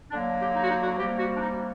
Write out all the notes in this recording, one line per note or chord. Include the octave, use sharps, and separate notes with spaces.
D3 F#3 A#3 D4
G4
D#4
F#4
D#4
F#4
C3 G3 A#3 G4
F#4
D4
D#4